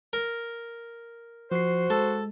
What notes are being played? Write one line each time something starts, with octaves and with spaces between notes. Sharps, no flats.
A#4
F3 F#4 C5 C7
G#3 A4